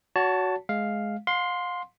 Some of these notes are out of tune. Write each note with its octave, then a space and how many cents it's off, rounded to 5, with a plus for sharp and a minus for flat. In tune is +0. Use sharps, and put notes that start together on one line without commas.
F#4 +0 C#5 +35 A5 +5
G#3 +10 F5 +0
F5 +35 C6 +0